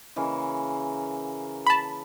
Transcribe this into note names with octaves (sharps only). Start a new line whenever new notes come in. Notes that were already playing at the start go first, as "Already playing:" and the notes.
C#3 E3 A#3
A5 B5